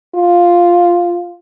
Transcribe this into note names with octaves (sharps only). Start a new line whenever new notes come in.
F4